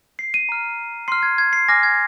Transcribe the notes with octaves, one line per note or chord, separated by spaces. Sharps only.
C7
D#7
A#5 F6
C6 F6 C7
G#6
G#6
C7
G#5 D6 F6 A#6
G#6